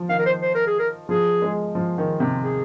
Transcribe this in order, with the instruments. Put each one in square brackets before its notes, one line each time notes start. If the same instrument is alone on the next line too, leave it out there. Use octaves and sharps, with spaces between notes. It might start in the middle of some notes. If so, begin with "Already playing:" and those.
Already playing: [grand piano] F3
[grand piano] D#3 [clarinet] F5
[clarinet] A#4
C5
C5
A#4
G#4
A#4
[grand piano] F3 [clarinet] G#4
[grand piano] G#3
F3
D#3
C3
[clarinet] G#4